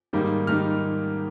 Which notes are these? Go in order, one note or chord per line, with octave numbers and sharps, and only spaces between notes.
G#2 D#3 G3 A#3 D#4
D#3 G3 A#3 D#4 F6